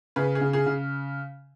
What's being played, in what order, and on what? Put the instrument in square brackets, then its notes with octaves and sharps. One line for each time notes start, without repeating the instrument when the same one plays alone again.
[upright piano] C#3 [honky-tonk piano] G#4 B4
[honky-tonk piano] G#4
[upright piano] C#3
[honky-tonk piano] G#4
[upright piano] C#3